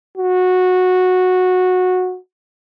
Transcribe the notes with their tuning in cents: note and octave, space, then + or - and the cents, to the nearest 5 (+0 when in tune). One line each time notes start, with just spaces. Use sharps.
F#4 -15